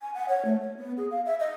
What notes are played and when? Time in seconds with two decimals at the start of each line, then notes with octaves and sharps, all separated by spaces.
0.01 G#5
0.14 F#5
0.28 C#5
0.45 A3
0.61 C#5
0.77 B3
0.97 G#4
1.11 F5
1.25 E5
1.40 D#5